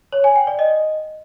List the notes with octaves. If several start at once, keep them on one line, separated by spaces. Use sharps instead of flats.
C#5
G#5
G5
D5
D#5